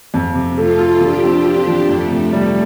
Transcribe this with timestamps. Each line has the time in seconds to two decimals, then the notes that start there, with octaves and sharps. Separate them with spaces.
0.14 F2
0.35 C3
0.57 A3 F4 A4
0.79 F4
1.01 F3 D4 G4
1.24 C4
1.45 F4
1.68 F3
1.89 F2 A3
2.11 C3
2.33 G3